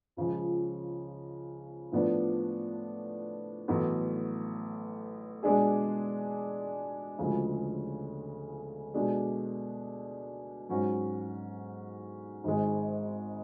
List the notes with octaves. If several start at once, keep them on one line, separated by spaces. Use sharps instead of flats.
C#2 C#3 F3
A2 F3 B3 D4
A1 A2 F#3 B3
B2 G#3 D4 G#4
D2 C#3 F3 G#3
B2 G#3 D4
G#2 F#3 C#4 F#4
G#1 G#2 G#3